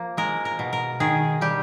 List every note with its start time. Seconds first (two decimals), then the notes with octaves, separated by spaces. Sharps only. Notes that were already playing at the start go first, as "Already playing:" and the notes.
Already playing: F3 A#3
0.17 G#3 A#4
0.45 A#4
0.59 B2
0.73 A#4
1.00 D#3 G#4
1.41 G3 G4